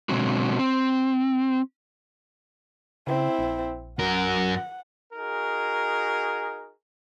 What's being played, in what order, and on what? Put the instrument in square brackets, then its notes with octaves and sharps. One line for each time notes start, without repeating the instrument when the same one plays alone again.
[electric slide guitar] B2 D3 F#3 G#3 C4 F#4
C4
[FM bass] C#3 [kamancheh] C4 E4
[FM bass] A#1
[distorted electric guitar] F#2 A#4 [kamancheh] F#5
[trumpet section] D#4 F#4 G#4 A#4